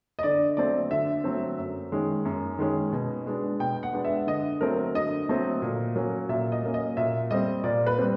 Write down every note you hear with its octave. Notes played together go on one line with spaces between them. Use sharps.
D#5
D3 D5
F#3 A3 C4 D5
D3 E5
F#3 A3 C4
F#2
D#3 G#3 C#4
F#2
D#3 G#3 C#4
B2
G#3 B3 D4
B2 G5
F#5
G#3 B3 D4
E5
D3 D#5
F#3 A3 C4 A#4
D3 D#5
F#3 A3 C4
A#2
F#3 A#3 C#4
A#2 E5
D#5
F#3 A#3 C#4
D#5
A#2 E5
G3 C4 D#5
A#2 D5
B4
G3 C4